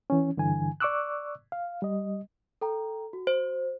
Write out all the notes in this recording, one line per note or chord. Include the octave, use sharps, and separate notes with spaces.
E3 C#4
G2 D3 E3 G#5
D5 C#6 D6 E6 F#6
F5
G3 D#5
A4 G5 A#5
F#4
C5